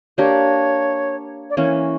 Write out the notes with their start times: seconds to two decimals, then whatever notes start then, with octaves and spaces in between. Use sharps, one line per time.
0.18 A#3 D4 G4 C#5
1.50 D5
1.57 E3 A#3 C#4 C#5